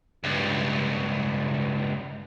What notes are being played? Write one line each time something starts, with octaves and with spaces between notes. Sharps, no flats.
C#2 G2